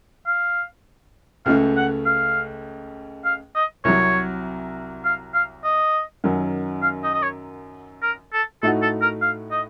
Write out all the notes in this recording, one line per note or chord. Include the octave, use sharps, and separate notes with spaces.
F5
C#2 C#3 A3 F5
F#5
F5
F5
D#5
C2 C3 F#3 C#5
F5
F5
D#5
F#2 D#3 F#3
F5
D#5
D#5
C#5
A#4
A4
A2 A3 D#4 F#4 A4
A4
A#4
F5
D#5